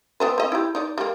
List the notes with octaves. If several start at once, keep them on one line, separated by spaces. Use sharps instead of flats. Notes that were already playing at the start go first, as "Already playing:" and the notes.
B3 C4 B4
C4 D#5
E4 G4
D#4 D5
G3 A#3